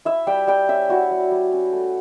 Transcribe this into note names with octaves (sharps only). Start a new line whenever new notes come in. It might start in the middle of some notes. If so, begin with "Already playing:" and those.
E4 E5
G3 G5
G3 G5
C#4 E5
E4 F#4
G3
G3
C#4
A3